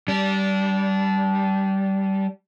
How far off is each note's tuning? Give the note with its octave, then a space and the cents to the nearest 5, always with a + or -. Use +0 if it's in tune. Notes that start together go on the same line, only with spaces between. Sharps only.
G3 -15 D4 -20